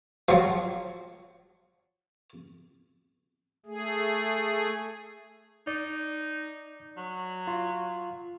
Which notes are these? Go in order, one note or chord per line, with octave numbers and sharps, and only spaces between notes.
F3 F#3
A3 G#4
D#4 D5
F#3
F4